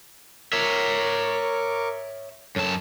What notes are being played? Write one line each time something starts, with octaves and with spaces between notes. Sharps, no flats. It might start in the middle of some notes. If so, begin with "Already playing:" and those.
A#4 C#5 E5 C#6 D6
F#2 A4 C#5 A5